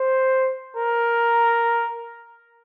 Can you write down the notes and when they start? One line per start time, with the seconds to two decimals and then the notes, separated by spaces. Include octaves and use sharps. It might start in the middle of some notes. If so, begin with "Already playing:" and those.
Already playing: C5
0.77 A#4